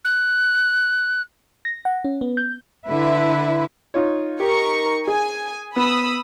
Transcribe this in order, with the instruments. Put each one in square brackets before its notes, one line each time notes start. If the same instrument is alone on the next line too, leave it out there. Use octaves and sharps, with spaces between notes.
[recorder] F#6
[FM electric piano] A#6
F#5
C#4
B3
G6
[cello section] D3 E4 B4 E5
[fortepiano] D#4 F4 C#5
[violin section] D#4 A#4 C#6 [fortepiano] G4
[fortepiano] G#4 [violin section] G#5
[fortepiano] B3 [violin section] B5 D#6 E6